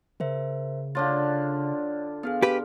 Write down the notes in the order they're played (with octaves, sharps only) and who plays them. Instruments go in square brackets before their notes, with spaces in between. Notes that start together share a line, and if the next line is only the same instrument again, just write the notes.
[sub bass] C#3 [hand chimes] A#4 C5 E5
[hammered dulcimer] D3 D4 F4 [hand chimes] C#5 A6
[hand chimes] B3 D4 G#4 [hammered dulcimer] F5
[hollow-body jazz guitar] G4 B4 [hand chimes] G#4